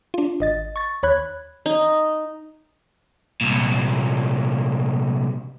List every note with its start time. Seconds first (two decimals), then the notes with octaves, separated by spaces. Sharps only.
0.14 D4 F4
0.40 G#1 D#5 A6
0.76 C#6 A6
1.03 D#2 C#5 B5 F#6 G#6
1.66 D#4
3.41 C2 A#2